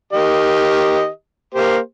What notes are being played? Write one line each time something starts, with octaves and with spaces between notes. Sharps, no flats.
D#3 G4 D#5
A#3 G4 C5